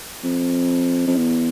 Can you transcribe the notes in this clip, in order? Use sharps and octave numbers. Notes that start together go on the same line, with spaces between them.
F2
F2
E2